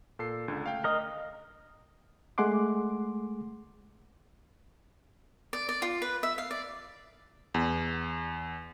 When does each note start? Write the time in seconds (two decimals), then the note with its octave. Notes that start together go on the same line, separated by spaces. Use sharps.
0.19 A#2 A4 C7
0.48 C#2 D3
0.64 A3 F5 G5
0.84 A#4 D#5
2.38 G#3 A3 G#4 F#5 C6 D6
5.53 D5
5.69 D5
5.82 F4
6.02 B4
6.23 E5
6.38 F5
6.51 D5
7.54 E2